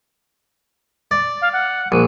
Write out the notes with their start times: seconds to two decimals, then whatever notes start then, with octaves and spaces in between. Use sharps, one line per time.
1.11 D5
1.41 F5
1.53 F#5
1.92 A#1 D#7